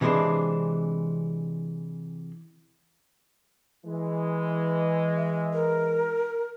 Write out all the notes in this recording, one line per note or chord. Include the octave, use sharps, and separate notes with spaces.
C3 E3 G3 G#3 C4 D4
E3 G#3
E5
A#4